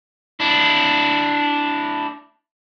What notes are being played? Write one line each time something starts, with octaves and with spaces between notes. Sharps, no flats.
D4 E4